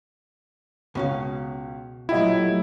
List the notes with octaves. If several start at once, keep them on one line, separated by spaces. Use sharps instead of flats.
C#2 B2 C#4 F5
A#2 F#3 A3 E4 F4 G4 D#5